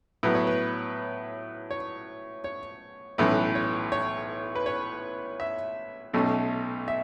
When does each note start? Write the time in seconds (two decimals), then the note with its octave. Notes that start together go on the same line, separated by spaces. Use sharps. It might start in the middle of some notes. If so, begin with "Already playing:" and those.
0.23 A2 F#3 B3 B4
0.35 C#5
0.47 B4
1.71 C#5
2.44 C#5
3.18 B1 A2 E3 C#4 B4
3.55 C#5
3.92 C#5
4.55 B4
4.66 C#5
5.40 E5
6.14 B1 B2 A3 C#4
6.88 E5